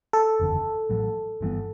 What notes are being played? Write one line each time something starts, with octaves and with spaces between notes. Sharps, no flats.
A4
F#1 E2 D3
A1 A2 F#3
G1 G2 E3 B3